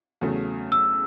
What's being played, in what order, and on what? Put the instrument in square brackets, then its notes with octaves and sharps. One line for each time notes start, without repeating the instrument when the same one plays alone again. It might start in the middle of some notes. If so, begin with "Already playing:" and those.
[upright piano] E2 C#3 F#3 A3
[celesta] E6